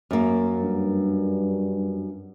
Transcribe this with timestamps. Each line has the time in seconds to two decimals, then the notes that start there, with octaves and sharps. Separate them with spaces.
0.11 F#2 A#3
0.61 G2